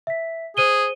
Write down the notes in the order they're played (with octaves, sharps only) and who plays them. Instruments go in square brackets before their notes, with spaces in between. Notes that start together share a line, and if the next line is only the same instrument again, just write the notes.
[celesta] E5 B6
[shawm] G#4 [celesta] C5 D#7 G7